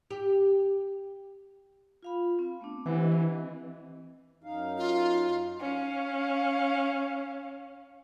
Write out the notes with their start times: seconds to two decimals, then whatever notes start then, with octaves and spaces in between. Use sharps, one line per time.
0.11 G4
2.03 F4 F5 B5
2.39 C4
2.61 A3 B3 D4
2.86 E3 G4 C5 F#5
3.00 C4 D#5
4.43 F#2 D#4 F5
4.78 F4
5.61 C#4 F5